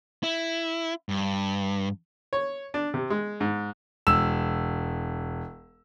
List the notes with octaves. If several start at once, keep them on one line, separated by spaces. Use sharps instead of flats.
E4
G2
C#5
D4
C3
G#3
G#2
E1 E6 E7